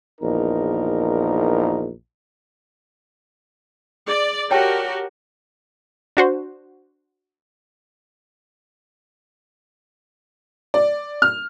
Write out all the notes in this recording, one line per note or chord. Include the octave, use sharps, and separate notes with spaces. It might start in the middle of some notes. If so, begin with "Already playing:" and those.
A#1 E2 D#4 A#4
G#4 D5
F#4 G4 A#4 C#5 G5 A5
D4 F#4 C5
D5
F6